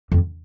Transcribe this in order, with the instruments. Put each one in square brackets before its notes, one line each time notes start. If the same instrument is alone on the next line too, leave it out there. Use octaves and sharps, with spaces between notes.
[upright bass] F2